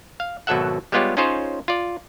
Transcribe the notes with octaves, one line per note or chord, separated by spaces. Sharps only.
F5
G#1 B2 F#3 A4 E5 F#5
G3 G#3 B3 F4 G4 C#5
C#4 D#4 F4 G#4 C5 C#5
F4 D5